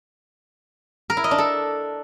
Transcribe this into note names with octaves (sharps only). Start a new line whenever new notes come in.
A#4
E4
D#5
D4
A4